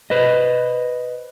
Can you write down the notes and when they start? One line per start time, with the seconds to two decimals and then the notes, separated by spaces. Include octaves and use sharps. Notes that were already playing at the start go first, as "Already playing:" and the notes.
0.10 B4 C5 D#5